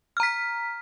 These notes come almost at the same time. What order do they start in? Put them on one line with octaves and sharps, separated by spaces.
F6 A#5 B6